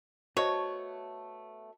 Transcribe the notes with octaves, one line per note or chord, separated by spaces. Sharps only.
A3 B3 F#4 C5 C#5 D#5